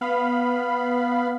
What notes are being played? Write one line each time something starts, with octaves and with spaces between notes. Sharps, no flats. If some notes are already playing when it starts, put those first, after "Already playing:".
B3 F5 B5